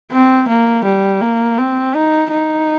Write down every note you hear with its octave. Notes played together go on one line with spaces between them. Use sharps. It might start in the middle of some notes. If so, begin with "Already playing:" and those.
C4
A#3
G3
A#3
C4
D#4
D#4